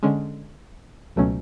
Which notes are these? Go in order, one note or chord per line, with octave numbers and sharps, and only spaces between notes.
D3 G#3 C#4
C#2 B2 F#3 A3 C#4